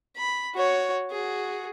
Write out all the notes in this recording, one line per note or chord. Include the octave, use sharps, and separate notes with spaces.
B5
F#4 C#5
F#4 G#4